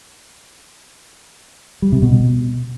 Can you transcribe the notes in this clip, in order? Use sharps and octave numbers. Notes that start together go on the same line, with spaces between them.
G3
C3
B2